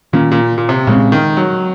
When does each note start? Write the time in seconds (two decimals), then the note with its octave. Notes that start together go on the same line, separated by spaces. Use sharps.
0.13 A#2 D#3 A#3 C#4
0.32 A#2
0.58 A#2
0.69 C3
0.87 A#2 C#3 G#3 C4
1.12 D#3
1.37 F#3